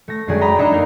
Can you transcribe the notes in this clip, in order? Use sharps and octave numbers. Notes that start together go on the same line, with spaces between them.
A3 A#6
F#2 D3 G3 G#3 G#4
G5 A#5 B5 D#6
D4 D#4 D#5 E5 E6
A3 A#3 A#4